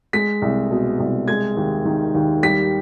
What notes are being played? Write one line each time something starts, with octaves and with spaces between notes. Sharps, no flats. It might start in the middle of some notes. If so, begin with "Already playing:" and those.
G#3 B6
C2
B2
C2
G#3 G#6
D#2
D#3
D#2
G3 B6